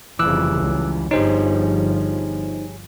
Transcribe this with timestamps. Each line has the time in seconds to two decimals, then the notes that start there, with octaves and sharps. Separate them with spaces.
0.19 F1 F2 C#3 E3 G3 D6 E6 F#6
0.56 C#2
1.11 G1 F3 D#4 G4 G#4 C5 C#5